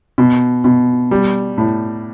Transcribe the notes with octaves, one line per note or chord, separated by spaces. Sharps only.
B2
B2
G3
A2